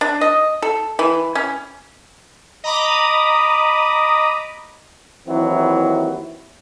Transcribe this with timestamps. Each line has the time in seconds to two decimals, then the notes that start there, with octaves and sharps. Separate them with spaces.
0.01 D4
0.21 D#5
0.62 A4
0.99 E3
1.35 C#4
2.64 D#5 A#5 B5 D6 D#6
5.27 D#2 E3 F#3 C4 E4